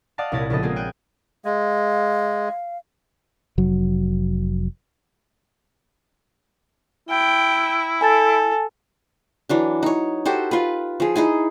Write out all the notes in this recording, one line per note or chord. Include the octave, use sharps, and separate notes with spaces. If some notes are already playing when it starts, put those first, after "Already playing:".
D5 D#5 F5 F#5 A5
C2 A#2 E4 C#5 A5 A#6
A#1 C#3 B3 A4 D#5
G#3 A#3 C4 F4 G#4
G5 G#5 F#6 G#6 D#7
G#3 F5
F1 F#3
E4 G5
A4 G#5 A5 A6
E3 F#3 D4
D#4 C#5
F#4 G4 A4 C5
F4 B4
F3 G#4
D#4 E4 G#4 G#5